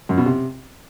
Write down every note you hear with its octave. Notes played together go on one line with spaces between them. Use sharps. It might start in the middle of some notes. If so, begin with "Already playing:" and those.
F#2
B2
C3